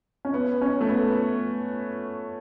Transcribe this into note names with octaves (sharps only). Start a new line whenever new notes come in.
C#4
B3
C#4
A3
B3